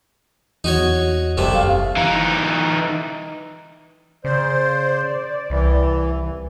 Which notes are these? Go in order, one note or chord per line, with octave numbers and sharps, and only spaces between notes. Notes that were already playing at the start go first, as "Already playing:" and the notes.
E2 D#4 F#4 C#5
F#1 C2 C3 A3
F5
E3 D#4
C#3 C5 D5
C2 E3